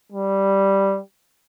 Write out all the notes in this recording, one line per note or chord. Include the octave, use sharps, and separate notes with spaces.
G3